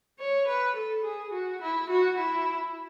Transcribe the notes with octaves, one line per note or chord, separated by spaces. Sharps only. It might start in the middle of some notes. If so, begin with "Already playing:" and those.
C#5
B4
A4
G#4
F#4
E4
F#4
E4